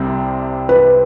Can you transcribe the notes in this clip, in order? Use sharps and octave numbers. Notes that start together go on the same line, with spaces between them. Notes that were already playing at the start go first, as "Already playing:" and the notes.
Already playing: C2 C3 G3 C4
B4